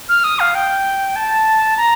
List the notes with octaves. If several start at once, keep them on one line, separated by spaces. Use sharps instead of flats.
F6
D#6
F5
G5
A5
A#5